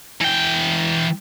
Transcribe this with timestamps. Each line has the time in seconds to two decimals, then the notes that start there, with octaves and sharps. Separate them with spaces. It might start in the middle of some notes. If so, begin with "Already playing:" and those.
0.21 E3 G5